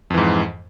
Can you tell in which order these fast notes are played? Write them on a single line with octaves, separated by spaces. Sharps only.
F2 E3 G#2